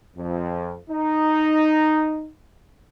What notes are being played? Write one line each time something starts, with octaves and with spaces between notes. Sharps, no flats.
F2
D#4